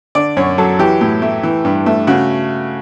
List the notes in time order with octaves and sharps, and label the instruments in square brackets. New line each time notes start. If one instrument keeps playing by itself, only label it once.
[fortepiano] D3 D5
F#2 C#5
F#3 A4
E3 G4
A2
A3
E3
G2
A3
C#3 F#4